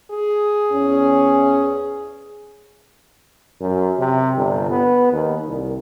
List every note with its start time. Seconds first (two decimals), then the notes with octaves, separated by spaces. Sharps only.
0.11 G#4
0.71 E2 C#4
3.60 F#2
3.99 C3
4.36 G1
4.71 B3
5.13 D#2
5.49 C2